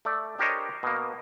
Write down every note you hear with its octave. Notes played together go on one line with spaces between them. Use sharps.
A3 D5
D4 G4 A#4 C5 C#5 D#5
B2 A#3